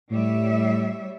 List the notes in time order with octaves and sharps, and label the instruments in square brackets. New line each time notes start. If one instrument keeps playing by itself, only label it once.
[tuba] A2 [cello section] G3 C#5 E5